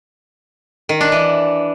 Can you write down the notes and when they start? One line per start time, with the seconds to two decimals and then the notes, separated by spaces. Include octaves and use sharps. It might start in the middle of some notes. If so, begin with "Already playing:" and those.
0.89 D#3
1.01 D4
1.12 E3